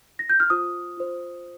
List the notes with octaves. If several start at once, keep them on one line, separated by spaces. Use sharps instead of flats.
A#6
G6
F6
F4 C5 D#6
F4 C5